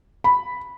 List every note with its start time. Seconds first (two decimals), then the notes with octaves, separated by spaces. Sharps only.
0.24 B5